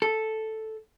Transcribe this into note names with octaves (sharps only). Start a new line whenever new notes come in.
A4